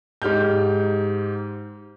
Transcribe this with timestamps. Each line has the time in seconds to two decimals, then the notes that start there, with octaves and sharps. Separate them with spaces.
0.22 G#2 G4 F6 G6